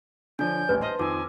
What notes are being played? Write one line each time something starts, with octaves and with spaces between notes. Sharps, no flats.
D3 F3 D4 C#5 D5 G#5 G6
D#1 A1 B4
C5 D#5 A5 C6 F6
F2 D#3 F3 G#5 D6 E6